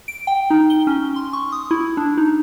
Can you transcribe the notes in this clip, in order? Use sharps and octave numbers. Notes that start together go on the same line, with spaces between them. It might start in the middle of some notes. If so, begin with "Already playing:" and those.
D7
G5
D#4
G7
C#4
C6
C#6
D#6
E4
D4
D#4